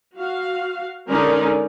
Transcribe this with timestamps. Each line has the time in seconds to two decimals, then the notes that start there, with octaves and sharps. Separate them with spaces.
0.17 F#4 F5
1.08 D3 G#3 C#4 D#4 A#4 D5